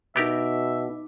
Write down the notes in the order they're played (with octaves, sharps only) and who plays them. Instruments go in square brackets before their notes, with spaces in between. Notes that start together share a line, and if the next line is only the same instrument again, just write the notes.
[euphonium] B2 [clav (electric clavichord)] B3 G4 A#4 [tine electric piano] D#4 D6 [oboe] E5